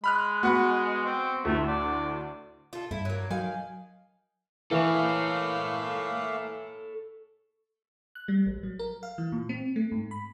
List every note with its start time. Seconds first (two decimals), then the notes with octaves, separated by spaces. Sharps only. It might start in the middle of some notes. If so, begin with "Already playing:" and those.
0.04 G#3 B5 F6 F#6
0.43 B3 F#4 F#5 B5
1.05 C4
1.45 D2 A2 A3
1.67 D5
2.73 F4 A4
2.91 G2 E4 A4
3.05 F#3 A#3
3.31 D#3 F#3 F5 G#5
4.71 E3 A3 A#3 A4 C#5 F5
8.15 F#6
8.28 G3
8.46 A1
8.63 F#3
8.79 A#4
9.03 F5
9.18 E3
9.32 A#2
9.49 C4
9.76 A3
9.92 G#2
10.11 B5